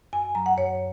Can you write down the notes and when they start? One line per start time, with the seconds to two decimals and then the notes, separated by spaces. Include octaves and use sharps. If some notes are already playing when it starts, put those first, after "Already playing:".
0.13 F#2 G#5
0.35 F#3 A#5
0.46 F#5
0.57 F#2 C#5